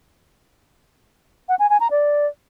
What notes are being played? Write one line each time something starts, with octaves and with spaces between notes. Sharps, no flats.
F#5
G#5
G#5
A#5
D5